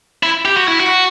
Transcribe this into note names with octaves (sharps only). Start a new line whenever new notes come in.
E4
G4
F#4
E4
F#4